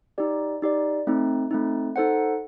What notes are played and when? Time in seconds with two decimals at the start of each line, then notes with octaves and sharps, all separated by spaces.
0.18 D#4 G4 D5
0.62 D#4 G4 D5
1.07 A3 C4 D#4
1.51 A3 C4 D#4
1.96 D#4 A4 C5 F#5